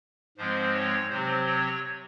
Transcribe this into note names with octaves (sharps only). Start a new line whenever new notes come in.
G#2 F3 G#3 C4 C5
C#5
C3 F#3 C4 C5
C#5